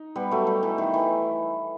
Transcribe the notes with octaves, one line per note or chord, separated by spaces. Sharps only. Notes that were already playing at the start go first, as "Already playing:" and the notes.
Already playing: D#4
G3 B3
F#3 A3
G3
E3
D#3
E3